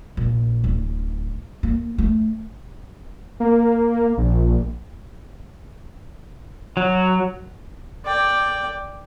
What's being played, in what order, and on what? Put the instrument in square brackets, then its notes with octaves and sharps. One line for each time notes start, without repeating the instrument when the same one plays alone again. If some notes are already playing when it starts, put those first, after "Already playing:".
[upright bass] A#1
D1
A#3
A3
[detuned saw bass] A#3
A#1
[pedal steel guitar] F#3
[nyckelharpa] D5 G5